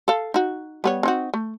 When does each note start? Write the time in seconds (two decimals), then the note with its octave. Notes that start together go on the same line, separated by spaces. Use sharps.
0.08 A4 F5
0.34 D#4 F#4
0.84 G3 B3 C#5
1.03 C4 D#4 F#4
1.34 A3